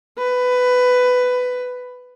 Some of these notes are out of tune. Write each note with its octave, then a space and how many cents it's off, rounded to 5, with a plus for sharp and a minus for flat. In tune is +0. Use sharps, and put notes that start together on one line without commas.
B4 +15